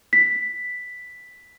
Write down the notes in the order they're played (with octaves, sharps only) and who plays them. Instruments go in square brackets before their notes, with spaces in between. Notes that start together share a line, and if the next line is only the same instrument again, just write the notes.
[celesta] B6